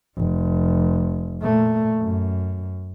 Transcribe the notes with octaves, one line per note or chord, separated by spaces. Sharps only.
F1
A#2 A3
F#2